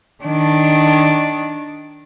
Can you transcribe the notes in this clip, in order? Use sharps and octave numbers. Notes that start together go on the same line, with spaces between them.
D#3 D4